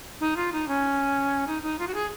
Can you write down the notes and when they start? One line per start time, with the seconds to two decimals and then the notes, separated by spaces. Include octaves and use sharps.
0.20 D#4
0.37 F4
0.52 D#4
0.68 C#4
1.47 D#4
1.63 D#4
1.79 F4
1.87 F#4
1.94 G#4